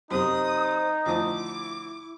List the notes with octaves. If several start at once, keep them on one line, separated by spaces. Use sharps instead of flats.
F#2 C3 D#4 C5 D#6
D2 F3 E4 D6 D#6